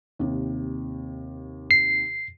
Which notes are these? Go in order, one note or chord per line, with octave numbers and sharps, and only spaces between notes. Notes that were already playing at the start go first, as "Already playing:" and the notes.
D#2 C3
C7